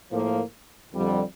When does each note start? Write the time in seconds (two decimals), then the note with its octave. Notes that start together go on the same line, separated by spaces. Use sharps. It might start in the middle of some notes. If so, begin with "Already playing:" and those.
0.10 A2 F3 A#3
0.92 F2 D3 G3